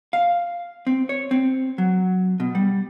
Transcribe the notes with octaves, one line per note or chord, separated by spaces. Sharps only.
F5
C4
C#5
C4
F#3
B2
G3